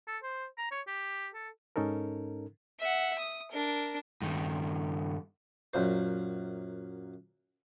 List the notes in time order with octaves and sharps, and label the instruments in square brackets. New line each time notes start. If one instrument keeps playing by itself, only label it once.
[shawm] A4
C5
A#5
C#5
G4
A4
[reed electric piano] G#2 C#4 D#4 A4 A#4
[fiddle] E5 F#5
D#6
D4 A#4
[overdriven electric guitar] G2 D#3
[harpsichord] F#2 A#2 C5